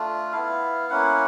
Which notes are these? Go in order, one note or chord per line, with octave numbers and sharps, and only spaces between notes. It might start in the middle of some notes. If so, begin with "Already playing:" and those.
Already playing: A3 D4 F4
B3 E4 F5
A#3 C#4 E4 F#5